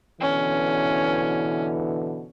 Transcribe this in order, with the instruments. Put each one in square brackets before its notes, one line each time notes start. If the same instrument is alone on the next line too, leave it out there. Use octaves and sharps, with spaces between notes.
[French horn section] B2 D3 E3 [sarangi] C#4